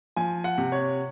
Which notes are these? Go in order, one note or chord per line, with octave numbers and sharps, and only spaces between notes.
F3 G#5
F#5
C3
C#5